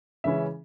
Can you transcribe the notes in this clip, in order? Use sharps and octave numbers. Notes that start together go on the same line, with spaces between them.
C#3 E3 G#3 C#4 E4 E5